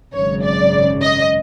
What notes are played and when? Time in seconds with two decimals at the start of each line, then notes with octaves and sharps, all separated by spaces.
0.13 G#1 F#2 C#3 C#5
0.43 D5
1.02 D#5